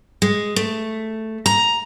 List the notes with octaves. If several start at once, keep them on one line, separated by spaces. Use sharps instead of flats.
G#3
A3
A#5